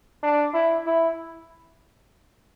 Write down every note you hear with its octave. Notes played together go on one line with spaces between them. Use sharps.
D4
E4
E4